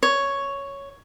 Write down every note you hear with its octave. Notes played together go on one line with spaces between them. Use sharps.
C#5